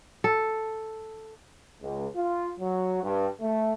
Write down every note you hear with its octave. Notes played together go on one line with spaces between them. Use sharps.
A4
C#2
F4
F#3
G2
A3